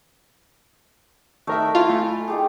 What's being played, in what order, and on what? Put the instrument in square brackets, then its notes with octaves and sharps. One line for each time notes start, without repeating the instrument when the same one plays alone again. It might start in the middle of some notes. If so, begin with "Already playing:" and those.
[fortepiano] D#3 A#4 E5 [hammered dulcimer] A3
[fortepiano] E4 [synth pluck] F4
[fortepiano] A3 [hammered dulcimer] E4 G#5
[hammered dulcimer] D#3 G4 G#4